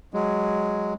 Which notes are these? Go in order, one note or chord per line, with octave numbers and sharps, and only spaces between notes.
F#3 G#3